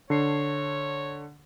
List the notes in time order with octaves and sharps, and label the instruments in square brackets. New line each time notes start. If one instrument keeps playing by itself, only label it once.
[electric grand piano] D3 D4 C7 [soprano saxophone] C#5